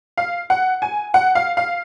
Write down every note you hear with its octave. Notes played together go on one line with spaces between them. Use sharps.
F5
F#5
G#5
F#5
F5
F5